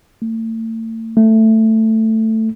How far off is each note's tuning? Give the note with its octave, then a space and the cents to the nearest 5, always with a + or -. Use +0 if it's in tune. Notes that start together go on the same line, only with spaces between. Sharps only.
A3 +40
A3 +10